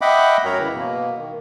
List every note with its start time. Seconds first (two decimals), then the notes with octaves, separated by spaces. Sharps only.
0.01 D#5 E5 F#5 G5 B5 D6
0.45 F#2 F#4 A#4 C#5 A#5
0.60 C#3 E3 E4
0.74 B2 A#3
1.17 D#3